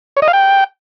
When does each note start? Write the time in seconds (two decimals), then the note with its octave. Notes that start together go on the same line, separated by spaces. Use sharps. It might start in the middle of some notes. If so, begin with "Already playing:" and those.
0.17 C#5
0.22 D#5
0.28 F5
0.33 G5